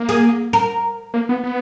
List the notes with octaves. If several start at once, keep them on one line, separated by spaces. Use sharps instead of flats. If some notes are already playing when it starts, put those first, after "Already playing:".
Already playing: A#3
G#4
A#4
A#3
B3
B3